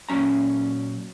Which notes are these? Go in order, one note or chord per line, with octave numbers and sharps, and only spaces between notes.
A#2 F#3 C#4 A#5